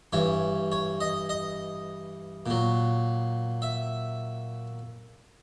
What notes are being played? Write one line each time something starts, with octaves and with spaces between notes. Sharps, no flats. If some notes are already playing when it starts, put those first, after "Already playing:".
G2 E3 C#5
C#5
D#5
D#5
A#2 F#3
E5